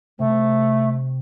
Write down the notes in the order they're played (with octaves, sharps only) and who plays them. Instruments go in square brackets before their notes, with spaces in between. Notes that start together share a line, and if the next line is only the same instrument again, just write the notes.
[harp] C3 [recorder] A3